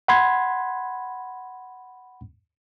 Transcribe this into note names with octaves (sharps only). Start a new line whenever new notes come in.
F#5 B5 C6 G#6